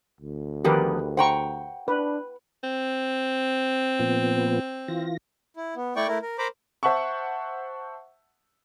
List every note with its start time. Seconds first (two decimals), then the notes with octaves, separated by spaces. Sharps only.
0.21 D2
0.64 D#3 F3 B3 G4 A#4 B4
1.17 C5 F#5 G5 A#5 C#6
1.88 D4 B4
2.63 C4
3.99 A#2 F3 B3
4.88 E3 F4 A#6
5.56 E4
5.76 B3
5.96 A3 E4 D5 G5 C#6
6.08 A3 E4 A#4
6.22 A#4
6.38 A#4 C5 A#5 B5 D6
6.83 C5 E5 F#5 A5 C#6